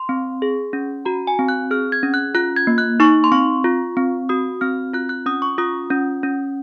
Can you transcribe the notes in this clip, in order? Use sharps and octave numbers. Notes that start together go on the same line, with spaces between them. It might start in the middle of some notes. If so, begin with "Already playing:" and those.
Already playing: C6
C4
G#4
C#4
F#4 A#5
G#5
C4
F#6
G#4 F6
G#6
C#4
F#6
F4 F#6
G#6
A#3
F#6
D#4 C#6
C6
C4 C#6
F4
C4
F#4 D#6
C4 F6
F4 F#6
F#6
C#4 D#6
C#6
F4 D#6
C#4
C#4